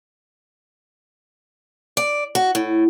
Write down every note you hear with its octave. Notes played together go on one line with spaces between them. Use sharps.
D5
F#4
A2